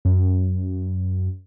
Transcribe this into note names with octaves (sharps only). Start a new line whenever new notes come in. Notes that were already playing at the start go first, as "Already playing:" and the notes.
F#2